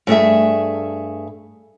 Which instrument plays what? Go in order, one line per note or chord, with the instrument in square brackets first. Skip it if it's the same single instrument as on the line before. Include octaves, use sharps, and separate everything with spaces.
[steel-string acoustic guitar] G2 A3 G#4 E5